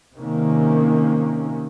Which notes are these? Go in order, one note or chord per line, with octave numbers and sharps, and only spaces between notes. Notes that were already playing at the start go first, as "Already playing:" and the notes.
C3 D#3 A#3 C#4